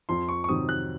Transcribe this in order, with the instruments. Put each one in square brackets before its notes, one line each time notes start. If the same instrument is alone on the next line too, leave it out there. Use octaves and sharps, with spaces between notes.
[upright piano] F2 [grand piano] C6
[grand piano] C#6
C#6
[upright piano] C3 D#3 F#3 C4 [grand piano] D#6
[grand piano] F#6